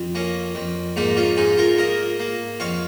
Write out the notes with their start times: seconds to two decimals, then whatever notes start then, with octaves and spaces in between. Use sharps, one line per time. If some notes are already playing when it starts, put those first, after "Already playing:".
Already playing: F2
0.15 A#3 C#4
0.55 F2
0.96 G#2 A#3 D#4
1.17 C#4 F4
1.37 G#2 D#4 G#4
1.58 F4 A#4
1.78 A#3 A#4 D#5
2.20 A#3
2.60 F2 C#5 F5